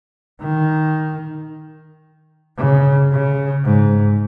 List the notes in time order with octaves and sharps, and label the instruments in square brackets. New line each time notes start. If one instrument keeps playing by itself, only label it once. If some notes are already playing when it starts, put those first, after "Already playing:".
[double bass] D#3
C#3
C#3
G#2